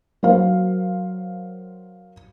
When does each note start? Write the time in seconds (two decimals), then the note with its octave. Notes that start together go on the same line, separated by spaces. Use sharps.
0.23 F#3 A#4 C5 F5